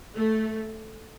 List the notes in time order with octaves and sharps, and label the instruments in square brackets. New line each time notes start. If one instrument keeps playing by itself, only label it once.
[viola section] A3